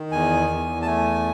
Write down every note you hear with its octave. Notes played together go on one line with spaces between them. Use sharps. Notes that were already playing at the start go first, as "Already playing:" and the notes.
Already playing: D#3
E2 G#5
E2
A5
A3 G#5